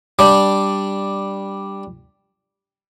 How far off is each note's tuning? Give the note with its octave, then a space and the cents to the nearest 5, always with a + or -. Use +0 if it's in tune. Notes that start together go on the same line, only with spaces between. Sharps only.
G3 +0 D4 +0